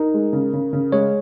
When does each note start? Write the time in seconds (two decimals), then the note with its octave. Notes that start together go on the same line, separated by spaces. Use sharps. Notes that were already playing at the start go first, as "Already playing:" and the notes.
Already playing: D#4 A#4
0.14 G#3
0.33 C#3
0.53 C#3
0.73 C#3
0.92 G#3 C#5